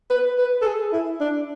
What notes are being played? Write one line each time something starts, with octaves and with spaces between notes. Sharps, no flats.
B4
B4
A4
G#4
E4
D4